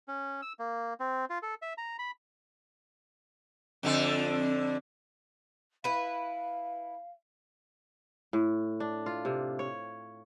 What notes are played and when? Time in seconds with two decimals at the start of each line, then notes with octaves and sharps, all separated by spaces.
0.08 C#4
0.42 E6
0.59 A#3
1.00 C4
1.30 F4
1.43 A4
1.62 E5
1.78 A#5
1.99 B5
3.83 F2 D3 A4
5.84 E4 B4 F5
8.33 A2
8.80 D4
9.06 F4
9.25 C3
9.59 C#5